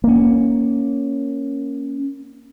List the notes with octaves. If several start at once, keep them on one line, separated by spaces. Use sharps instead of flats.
A#3 C#4